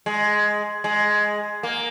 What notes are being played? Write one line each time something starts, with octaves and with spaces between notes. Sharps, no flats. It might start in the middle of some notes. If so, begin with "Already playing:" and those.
G#3
G#3
A#3